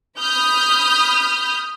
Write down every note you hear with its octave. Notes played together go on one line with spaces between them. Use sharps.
B5 D#6 F6 G6